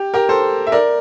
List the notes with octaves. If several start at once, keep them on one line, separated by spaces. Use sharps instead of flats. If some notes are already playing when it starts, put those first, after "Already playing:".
Already playing: G4
G4 A#4
A4 C5
E5
A#4 D5